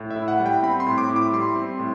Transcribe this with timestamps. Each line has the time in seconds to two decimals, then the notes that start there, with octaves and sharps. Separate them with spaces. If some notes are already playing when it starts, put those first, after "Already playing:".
Already playing: A2
0.11 E5
0.16 E4
0.28 F#5
0.40 G3
0.46 G5
0.63 C4 B5
0.80 C6
0.87 A2
0.98 D6
1.09 E4
1.16 D6
1.32 G3 C6
1.56 C4
1.79 A2